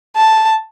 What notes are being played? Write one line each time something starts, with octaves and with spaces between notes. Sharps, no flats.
A5